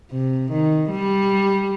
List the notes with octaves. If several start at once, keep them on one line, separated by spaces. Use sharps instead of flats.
C3
D#3
G3